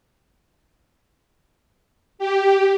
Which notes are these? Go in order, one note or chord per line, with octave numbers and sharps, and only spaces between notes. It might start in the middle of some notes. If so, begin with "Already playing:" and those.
G4